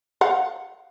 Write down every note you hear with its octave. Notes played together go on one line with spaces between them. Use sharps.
F5 F#5